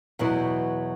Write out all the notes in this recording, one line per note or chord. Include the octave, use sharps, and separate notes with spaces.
E2 B2 F#3 B3 E4